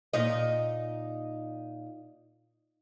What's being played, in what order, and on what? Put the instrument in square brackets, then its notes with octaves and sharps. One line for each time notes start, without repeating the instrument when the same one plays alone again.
[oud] A#2 D#4 D#5